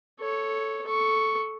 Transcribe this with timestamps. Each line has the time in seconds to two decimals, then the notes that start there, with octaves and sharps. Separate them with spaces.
0.20 A4 C#5
0.86 A4 C#6